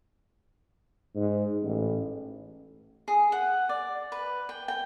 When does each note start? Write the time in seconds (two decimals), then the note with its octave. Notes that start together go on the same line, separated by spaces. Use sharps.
1.15 G#2
1.62 A1
3.08 G#4
3.32 F#5
3.69 D5
4.12 B4
4.49 G5
4.68 G5